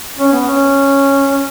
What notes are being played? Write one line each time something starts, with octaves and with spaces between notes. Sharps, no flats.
C#4
B3
C#4